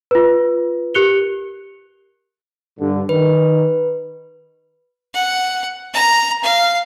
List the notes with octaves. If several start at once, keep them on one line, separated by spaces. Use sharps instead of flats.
F4 B4
G4 A#4 F#6 C#7 F7 G7
G2 D3
D#3 B4
F#5
A#5
F5